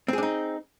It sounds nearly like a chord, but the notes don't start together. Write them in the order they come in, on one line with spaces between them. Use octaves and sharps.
C4 G#4 D4 D#4